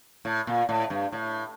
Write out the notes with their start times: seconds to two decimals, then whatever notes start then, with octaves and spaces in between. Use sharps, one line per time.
0.25 A2
0.47 A#2
0.69 A2
0.90 G2
1.12 A2